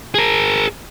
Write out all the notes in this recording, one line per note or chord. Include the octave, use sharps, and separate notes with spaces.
G#4 A#4